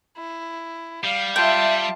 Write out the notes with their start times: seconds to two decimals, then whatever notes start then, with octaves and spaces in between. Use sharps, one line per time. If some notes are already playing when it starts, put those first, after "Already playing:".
0.18 E4
1.04 G3 F5
1.36 F4 E5 G5 A5